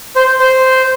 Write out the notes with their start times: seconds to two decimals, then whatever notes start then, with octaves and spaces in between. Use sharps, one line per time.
0.16 C5
0.40 C5